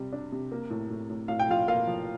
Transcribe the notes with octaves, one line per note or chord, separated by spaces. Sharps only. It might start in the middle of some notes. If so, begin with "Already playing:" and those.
Already playing: C3 G3
D4
C3
A#3
A2
A2
A2
A2 F5
G5
F3 F4 F5
A#3 F4 F5
F3